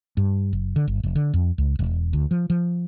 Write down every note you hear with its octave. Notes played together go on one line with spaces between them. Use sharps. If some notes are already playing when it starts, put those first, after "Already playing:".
G2
F#1
D3
G1
F1
D3
F2
C#2
E1
D2
F3
F3